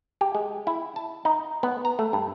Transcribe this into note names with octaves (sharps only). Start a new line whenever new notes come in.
G4
G#3
E4
A5
D#4
B3
A#5
A3
G2